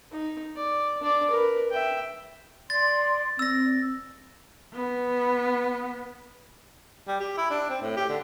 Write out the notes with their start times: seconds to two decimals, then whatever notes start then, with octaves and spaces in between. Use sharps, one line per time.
0.11 D#4
0.56 D5
1.01 D4 D5
1.31 A#4 B4
1.71 E5 G5
2.70 D5 C6 A6
3.39 C4 D5 E6 A#6
4.73 B3
7.08 G3
7.20 G4
7.37 E4
7.50 D4
7.70 C4
7.82 A2
7.97 G4
8.09 D3